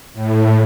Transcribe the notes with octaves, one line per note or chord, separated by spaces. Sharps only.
A2